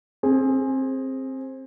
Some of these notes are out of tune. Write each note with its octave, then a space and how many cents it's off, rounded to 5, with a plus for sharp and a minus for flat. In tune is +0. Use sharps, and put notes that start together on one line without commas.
C4 +20 G#4 +0